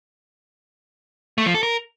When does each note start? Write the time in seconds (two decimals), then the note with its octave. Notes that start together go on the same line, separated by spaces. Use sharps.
1.38 A3
1.46 F3
1.54 A4
1.63 A#4